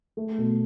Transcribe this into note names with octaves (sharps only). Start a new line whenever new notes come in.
A3
B2